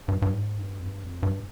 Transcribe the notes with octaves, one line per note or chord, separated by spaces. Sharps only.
G2
G2
G#2
G2
F2
G2
F2
G2